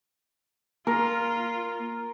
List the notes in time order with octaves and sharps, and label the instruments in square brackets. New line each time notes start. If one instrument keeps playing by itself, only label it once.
[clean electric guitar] A#3 [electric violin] F4 [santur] A#4